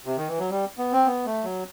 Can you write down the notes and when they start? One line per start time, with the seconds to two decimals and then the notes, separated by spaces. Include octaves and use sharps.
0.06 C3
0.17 D#3
0.28 E3
0.39 F#3
0.50 G3
0.78 B3
0.92 C4
1.06 B3
1.25 A3
1.44 F#3